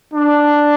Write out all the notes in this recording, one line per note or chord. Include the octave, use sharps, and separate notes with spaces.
D4